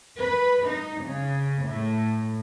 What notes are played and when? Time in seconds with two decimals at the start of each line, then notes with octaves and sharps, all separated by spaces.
0.19 B4
0.67 D#4
1.02 C#3
1.65 A2